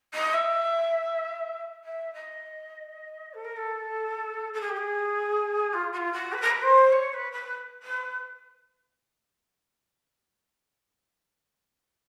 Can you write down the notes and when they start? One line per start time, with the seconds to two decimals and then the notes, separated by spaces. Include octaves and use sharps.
0.14 D#5
0.33 E5
1.83 E5
2.13 D#5
3.34 A4
3.44 A#4
3.56 A4
4.53 A4
4.60 G#4
4.69 G4
4.76 G#4
5.73 F4
5.92 F#4
5.97 F4
6.12 F#4
6.33 B4
6.42 A#4
6.50 B4
6.62 C5
6.92 C#5
7.13 B4
7.32 B4
7.82 B4